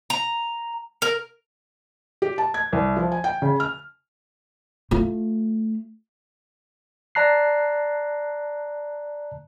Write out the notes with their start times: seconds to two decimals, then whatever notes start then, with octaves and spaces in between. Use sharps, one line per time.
0.10 A#5
1.02 A#4
2.22 G4
2.38 A5
2.54 G#6
2.73 C2
2.97 F3
3.12 G#5
3.24 G5
3.42 C#3
3.60 F6
4.91 A3 F4
7.15 D5 A5 A#5 F#6 C7